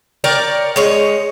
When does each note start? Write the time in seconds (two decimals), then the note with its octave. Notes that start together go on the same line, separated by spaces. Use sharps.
0.24 A#4 C#5 D5 G5
0.76 G#3 C#5 D#5